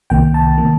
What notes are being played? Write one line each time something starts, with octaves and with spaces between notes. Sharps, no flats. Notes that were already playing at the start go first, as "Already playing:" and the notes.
C2 C3 D#3 A#3 G5
A5
C3 D#3 A#3